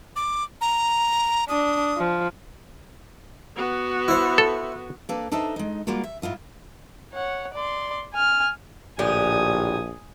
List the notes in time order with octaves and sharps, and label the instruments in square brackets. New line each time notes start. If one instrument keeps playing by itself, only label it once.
[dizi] D6
A#5
[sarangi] D4 [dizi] D#6
[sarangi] F3
[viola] B3 F#4
[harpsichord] E4 C5
[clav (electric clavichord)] A4
[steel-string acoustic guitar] A#3 D4 A4 B4
D4 D#4 A4 C5 D#5 E5
G#3 D#4
G3 G#3 A#3 F4 F#4
E5
G#2 E4 F4 D#5
[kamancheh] C#5 F#5
D5 C6
G#5 F6
[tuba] A#1 [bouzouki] A2 D3 G4 [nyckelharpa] G#5 D#6